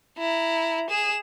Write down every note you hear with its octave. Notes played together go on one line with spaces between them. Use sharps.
E4 A#5
G#4 E7